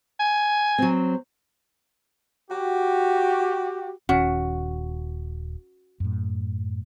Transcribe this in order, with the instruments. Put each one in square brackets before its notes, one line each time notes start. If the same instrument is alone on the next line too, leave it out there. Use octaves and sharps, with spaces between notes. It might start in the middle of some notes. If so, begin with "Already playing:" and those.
[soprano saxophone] G#5
[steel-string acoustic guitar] F#3 C4
[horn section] F#4 G4
[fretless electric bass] D#1 D#3 [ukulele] C#4 F#4
[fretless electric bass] F#2 A2